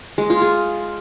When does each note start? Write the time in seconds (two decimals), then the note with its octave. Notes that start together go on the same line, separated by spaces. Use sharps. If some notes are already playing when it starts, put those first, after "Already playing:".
0.18 G#3
0.30 F4
0.42 G#4